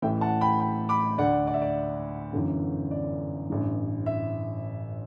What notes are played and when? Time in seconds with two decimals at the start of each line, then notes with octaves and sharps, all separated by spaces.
0.02 A1 A2 E3 E5 G5
0.21 F#5 A5
0.41 G5 B5
0.60 G5 B5
0.89 B5 D6
1.18 D2 D3 D5 F#5
1.47 D5
1.54 E5
1.62 D5
2.33 G1 F#2 E3
2.91 D5
3.50 A1 G2 E3
4.06 E5